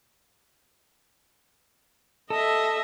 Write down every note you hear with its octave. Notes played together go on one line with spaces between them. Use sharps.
A4 D#5 E5